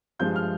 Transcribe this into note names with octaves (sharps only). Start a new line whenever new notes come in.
G2 F3 G#3 G6
F6